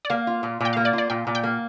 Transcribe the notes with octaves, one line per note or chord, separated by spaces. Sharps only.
D5
A#3 F5
F4
A#2
A#2 G5
A#3 F5
D5
F4
D5
A#2 G5
A#2
G5
A#3